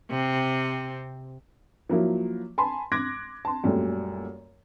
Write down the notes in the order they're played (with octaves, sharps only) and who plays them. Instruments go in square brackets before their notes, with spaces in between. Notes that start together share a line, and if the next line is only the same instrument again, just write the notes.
[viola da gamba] C3 C4
[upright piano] F3 F#3 A#3 E4
G#5 A5 B5 C6
C6 D6 F#6 G#6 A#6 D7
A5 C6
F#2 A#2 G3 A3